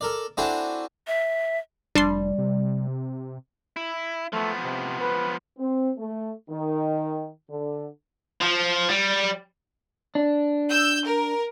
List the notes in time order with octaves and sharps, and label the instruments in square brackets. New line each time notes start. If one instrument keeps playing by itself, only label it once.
[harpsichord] A4 A#4 D5
C4 D4 E4 F#4 A4 G#5
[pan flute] E5
[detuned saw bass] F1 [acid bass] G3 [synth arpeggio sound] D4 A5 C6
[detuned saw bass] C3
[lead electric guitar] E4
[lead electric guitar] F3 B3 [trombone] A3
[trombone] C3
B4
[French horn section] C4
A3
D#3
D3
[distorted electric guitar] F3
G3
[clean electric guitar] D4
[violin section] E6 G6
A#4